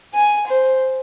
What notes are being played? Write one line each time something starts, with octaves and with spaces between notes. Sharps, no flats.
G#5
C5